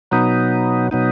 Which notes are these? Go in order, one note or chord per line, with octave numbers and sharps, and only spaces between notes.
B2 F#3 B3 D#4
B2 F#3 B3 D#4